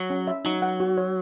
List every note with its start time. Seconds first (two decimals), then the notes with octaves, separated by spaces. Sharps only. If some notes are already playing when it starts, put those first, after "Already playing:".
Already playing: F#3
0.10 C#4
0.27 E5
0.45 F#3 D#4
0.62 F#5
0.80 F#4
0.97 C#5